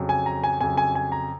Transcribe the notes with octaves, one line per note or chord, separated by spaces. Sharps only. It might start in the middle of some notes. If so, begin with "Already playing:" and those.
Already playing: F2 C#3 F#3
G#5
A#5
G#5
F2 C#3 F#3 G#5
G#5
G#5
A#5